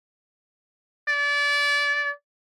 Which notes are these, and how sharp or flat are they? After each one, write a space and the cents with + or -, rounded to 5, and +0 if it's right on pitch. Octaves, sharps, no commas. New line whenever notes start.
D5 -30